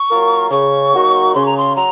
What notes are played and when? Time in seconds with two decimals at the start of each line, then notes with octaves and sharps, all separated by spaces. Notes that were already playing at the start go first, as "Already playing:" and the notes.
Already playing: C#6
0.09 F#3 A#3 F4 A#4
0.51 C#3 C#6
0.93 F#3 A#3 D#4 F#4
1.34 C#3 C6
1.46 A#5
1.57 C6
1.76 F#3 A#5